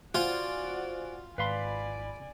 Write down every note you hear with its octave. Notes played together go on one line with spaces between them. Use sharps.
F4 F#4 C5 D5 F#5 G#5
G#1 B4 D5 F5 G#5 B5 C6